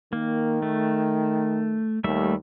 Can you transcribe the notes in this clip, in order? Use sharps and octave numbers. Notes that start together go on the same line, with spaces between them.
D#3 A#3
A3
D#2 G3 A3 E5